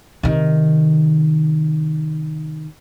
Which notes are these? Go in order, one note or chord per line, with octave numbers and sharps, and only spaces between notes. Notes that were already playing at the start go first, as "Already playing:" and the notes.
C3 D#3